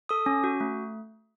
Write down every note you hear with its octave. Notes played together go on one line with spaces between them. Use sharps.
A4 D#6
C#4
F#4
A3